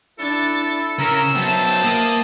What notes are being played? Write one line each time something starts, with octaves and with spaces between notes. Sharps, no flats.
D4 E4 A4 A6
C#3 C#4 A#4 E6
F#3 B3 C5 E5 G5 A5
A#3 D#6